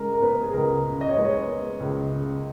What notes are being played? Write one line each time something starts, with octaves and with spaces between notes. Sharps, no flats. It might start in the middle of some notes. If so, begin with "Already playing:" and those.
Already playing: C#3 G#3 A#4
A#4
B3 B4
G#4
C#2 A#4
C#3
D#5
C#5
G#3 B4
C#5
B3
C#2
C#3